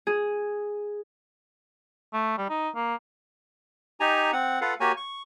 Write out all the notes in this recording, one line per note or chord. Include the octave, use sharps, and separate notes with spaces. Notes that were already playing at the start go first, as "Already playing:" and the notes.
G#4
A3
G3
D#4
A#3
D#4 G4 G#5 A#5
C4 F#5
F4 A4 B4 F5 F#5
A#3 F#4 G4 C#5 G#5
C#6